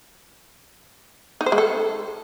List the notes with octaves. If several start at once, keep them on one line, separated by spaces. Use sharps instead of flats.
D#4
C5
G#3
A4